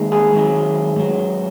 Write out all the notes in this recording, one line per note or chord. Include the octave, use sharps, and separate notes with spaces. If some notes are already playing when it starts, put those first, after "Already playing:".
Already playing: D#2 D#3 G#3
G#4
G#2 D#3 F#3
G#2 F#3